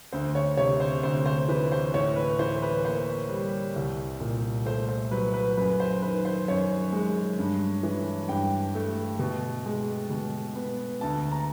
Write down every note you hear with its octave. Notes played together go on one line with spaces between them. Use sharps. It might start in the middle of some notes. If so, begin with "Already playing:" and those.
D2 C5
C#5
C3 C#5
C5
D2 C5
C5
E3 B4
C5
A2 C#5
B4
E3 C5
B4
A#3 C5
G3
C2
A#2
A3 C5
C5
F#3 B4
B4
F#2 B4
C5
D#3 B4
C5
F#2 C#5
G#3
G2
E3
G2 G5
A3
B2
G#3
B2
B3
D2 A5
A#5